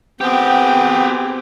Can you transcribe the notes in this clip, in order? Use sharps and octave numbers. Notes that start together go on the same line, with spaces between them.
B3 C4 G4 G#4 G5